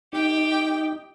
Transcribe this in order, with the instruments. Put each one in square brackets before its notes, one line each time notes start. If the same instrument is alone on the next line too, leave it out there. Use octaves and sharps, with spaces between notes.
[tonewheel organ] D#4 [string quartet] G4 G5